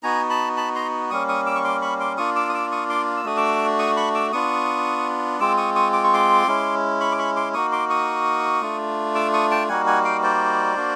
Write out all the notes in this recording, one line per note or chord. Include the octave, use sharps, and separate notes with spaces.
B3 D#4 F#4 G#5 A#5
A5 B5
A5 B5
A#5 C6
G3 A#3 C#4 C#6 D#6
C#6 D#6
D6 E6
C#6
C6 D6
B5 C#6
C6 D6
A#3 D4 F4 C#6 D#6
D6 E6
D#6
D6 E6
C#6 D#6
C6 D6
E6
A3 D4 F#4 D#6
D6 E6
C#6 D#6
B5 C#6
D6 E6
B3 D4 F4 C#6 D#6
G#3 C4 F4 D6 E6
C#6 D#6
C#6 D#6
D6
C#6
C6 D6
G#3 C#4 E4
B5 C#6
D6
B5 C#6
C6 D6
A#3 D#4 F#4 C#6 D#6
C6 D6
C#6 D#6
A3 D4 F4
D6 E6
C#6 D#6
G5 A5
G3 A#3 D#4 F#4 F#5 G#5
F#5 G#5
F5 G5
C5 D5
A#3 D4 F#4